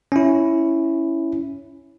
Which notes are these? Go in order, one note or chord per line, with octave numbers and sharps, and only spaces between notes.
C#4 E4